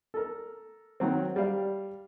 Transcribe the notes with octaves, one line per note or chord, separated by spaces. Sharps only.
A4 A#4
D#3 F#3 C4
G3 D5 F5